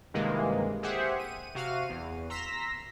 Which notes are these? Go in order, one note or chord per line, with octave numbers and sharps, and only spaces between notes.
G2 C3 D#3 E3 G#3 A#3
G4 G#4 C5 E5 F#5
D#7
C3 F#4 F5 F6 D#7
E2
A#5 C6 E6 A#6 B6